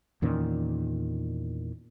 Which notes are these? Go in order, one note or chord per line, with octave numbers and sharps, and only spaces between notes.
E2 A#2 D#3 C#4